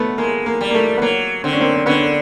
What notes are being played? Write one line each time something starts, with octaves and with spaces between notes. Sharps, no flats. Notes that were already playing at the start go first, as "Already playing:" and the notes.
Already playing: A3 B3
G#3 A#3
A#3
G3
A#3
A3
B3
F#3 A#3
D3 C4
C#4
A#3 C4
C4
D3 B3 C#4